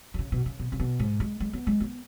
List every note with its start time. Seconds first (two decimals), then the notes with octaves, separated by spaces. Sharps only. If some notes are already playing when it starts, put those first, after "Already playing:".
0.14 D#3
0.19 C#3
0.32 B2
0.46 C#3
0.59 B2
0.72 C#3
0.79 B2
0.99 G#2
1.20 G#3
1.40 G#3
1.53 B3
1.67 G#3
1.80 B3